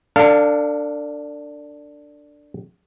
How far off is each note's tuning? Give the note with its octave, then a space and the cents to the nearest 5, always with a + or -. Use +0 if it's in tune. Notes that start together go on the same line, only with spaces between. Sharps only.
D4 +0 A4 +40 F5 +0